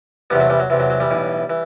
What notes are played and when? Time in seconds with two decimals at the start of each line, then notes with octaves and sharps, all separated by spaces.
0.30 E2 C3 E3 G3 B3
0.40 F#3 A3
0.50 E3 G3
0.60 F#3
0.70 E2 C3 E3
0.80 F#3
0.90 F#3
1.00 E3 G3
1.10 B1 A2 E3
1.50 E3